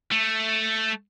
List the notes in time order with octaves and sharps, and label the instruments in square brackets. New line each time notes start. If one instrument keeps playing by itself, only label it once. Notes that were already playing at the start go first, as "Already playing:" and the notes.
[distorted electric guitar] A3